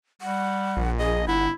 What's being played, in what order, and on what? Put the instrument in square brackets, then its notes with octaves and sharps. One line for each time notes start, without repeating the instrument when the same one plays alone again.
[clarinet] G3 [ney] F#5
[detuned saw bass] A#1
[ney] G#4 [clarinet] D#5
[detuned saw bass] G1 [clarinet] E4 [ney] F#5